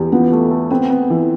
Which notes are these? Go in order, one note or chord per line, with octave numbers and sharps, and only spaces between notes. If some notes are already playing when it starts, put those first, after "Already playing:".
Already playing: E2 G4
F3 B3
A3
A3
B3 C4
B3
E3